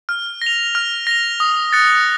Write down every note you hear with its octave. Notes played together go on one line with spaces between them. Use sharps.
F6
A#6 F7
F6
A#6 F7
D#6
F#6 A6 C#7